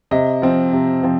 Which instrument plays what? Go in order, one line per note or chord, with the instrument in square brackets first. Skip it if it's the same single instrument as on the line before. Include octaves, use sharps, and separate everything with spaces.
[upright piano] C3 D#5
F3 C4
C3
F3 C4